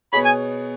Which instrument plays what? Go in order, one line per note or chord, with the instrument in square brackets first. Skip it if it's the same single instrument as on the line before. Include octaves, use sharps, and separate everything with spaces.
[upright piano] B2 B3 G#4 C#5 [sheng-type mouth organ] B5
[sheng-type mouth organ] G#5